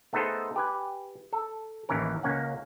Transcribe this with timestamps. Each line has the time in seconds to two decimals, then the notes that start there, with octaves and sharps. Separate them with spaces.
0.13 A3 B3 D#4 G#4 A4 C5
0.56 G4 B4 G#5
1.33 A4
1.89 A1 D#2 E3 C#4 A#4
2.23 C#2 A#3 C#4 F#5